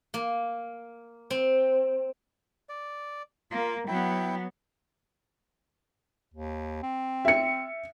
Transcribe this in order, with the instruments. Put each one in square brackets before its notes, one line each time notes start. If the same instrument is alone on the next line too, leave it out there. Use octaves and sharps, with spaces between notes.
[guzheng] A#3
C4
[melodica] D5
[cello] A#3 [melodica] F4
[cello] F#3 B3 [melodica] E4 G5
[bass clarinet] D#2
C4
[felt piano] E5 C#7